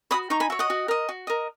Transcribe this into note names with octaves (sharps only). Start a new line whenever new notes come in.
F#4 C#5 B5 D#6
D#4 A#5 C#6
G#5 B5
F#4 C#5 E5
D#5 F#5
F#4
A#4 D#5
F#4
A#4 D#5